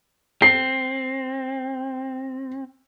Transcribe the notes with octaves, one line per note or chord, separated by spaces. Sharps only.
C4 C7